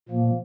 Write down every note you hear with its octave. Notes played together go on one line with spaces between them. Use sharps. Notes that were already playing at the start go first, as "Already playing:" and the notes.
A#2 F3 A#3